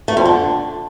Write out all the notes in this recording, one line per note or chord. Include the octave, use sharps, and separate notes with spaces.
A3
F2
D3